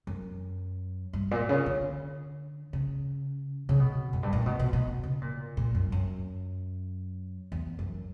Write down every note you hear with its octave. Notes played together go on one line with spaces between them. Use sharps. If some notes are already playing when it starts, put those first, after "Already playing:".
F#2
G2
A#2
C#3
D3
C#3
C#3
B2
F#2
G2
A#2
B2
B2
B2
C#3
A#2
A#2
F#2
F#2
E2
F#2